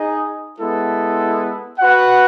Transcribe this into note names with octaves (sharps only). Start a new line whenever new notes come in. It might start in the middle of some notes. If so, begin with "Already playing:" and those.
Already playing: D#4 G#4 D#5
G#3 B3 E4 A4
F#4 B4 F#5